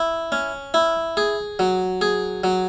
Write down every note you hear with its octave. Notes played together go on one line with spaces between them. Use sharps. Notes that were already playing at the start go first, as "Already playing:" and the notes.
Already playing: E4
C#4
E4
G#4
F#3
G#4
F#3